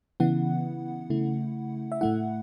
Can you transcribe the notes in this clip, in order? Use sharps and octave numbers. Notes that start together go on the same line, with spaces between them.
C#3 E3 B3 E4 F#5
C#3 A3 E4
E5
A2 A3 E4 F#5